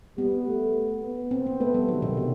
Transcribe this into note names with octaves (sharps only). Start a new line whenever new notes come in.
G3 B3
A3
B3
C4
B3
A3 B3
G3
D#3 F#3
B2
C3